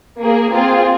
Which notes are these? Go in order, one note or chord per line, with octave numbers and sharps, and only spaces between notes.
A#3 G#4
C4 F4 G#4